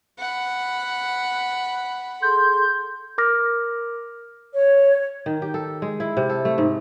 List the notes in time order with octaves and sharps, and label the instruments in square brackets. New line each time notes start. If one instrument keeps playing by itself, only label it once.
[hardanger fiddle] F#5 B5
[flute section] G#4 A4 C6 [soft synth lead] G6
[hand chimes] A#4 D6 F6 A#6
[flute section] C#5
[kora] D#3
G4
A4
G#3
E4
C3
A4
A3
G#2